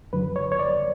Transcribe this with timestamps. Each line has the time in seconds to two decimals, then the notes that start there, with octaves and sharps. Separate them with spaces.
0.13 F#2 D3 F#3 B4
0.36 C#5
0.52 C#5
0.59 D5